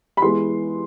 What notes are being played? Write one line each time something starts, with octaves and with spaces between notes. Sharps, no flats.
B5
E3 G#3 B3 C6